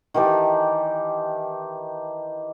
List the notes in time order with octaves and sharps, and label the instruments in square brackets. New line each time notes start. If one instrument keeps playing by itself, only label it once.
[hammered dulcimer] D#3 E3 G4 A5